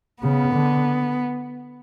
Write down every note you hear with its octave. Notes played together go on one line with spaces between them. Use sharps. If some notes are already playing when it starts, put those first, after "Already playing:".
C#3 B3
D3